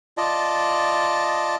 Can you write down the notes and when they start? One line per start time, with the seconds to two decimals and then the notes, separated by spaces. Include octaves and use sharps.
0.17 F4 D5 D#5 A5